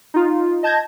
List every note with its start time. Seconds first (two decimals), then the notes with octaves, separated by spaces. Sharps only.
0.14 D#4 F4
0.63 D#5 A5 G6 G#6 A#6